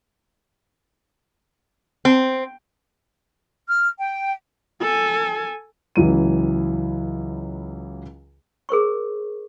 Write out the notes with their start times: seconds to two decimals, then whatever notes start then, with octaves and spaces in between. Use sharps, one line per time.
2.05 C4
3.68 F6
3.98 G5
4.81 A4 G#5
5.96 C#2 E3 F#3 D#7
8.69 G#4 A#4 C5 C#6